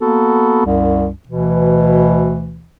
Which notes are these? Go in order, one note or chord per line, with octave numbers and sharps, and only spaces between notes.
A#3 B3 F#4 A4
C2 F#2
D2 B2 E3